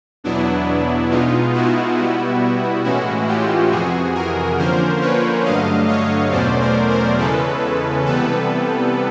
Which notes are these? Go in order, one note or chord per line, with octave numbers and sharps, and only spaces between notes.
E2 B2 F#3 B3 D4 E4
B2 G#3 B3 D#4 F4
E4 F#4
B2 G3 B3
A2 E3 G#3 C#4 E4 F#4
F4 G4
F2 C3 E3 F#4 G#4
G#4 A#4
D3 F3 A#3 C#4 A#4 C5
B4 C#5
G2 D3 F#3 A3 D#5 F5
C#5 D#5
E2 B2 F#3 A3 C#4 C5 D5
A#4 C5
A#4 C5
E2 C#3 E3 G#3 C#4 A4 B4
C3 E3 G3 B3 A4 B4